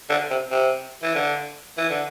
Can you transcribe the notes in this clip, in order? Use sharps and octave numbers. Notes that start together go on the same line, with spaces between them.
D3
C3
C3
E3
D3
E3
D3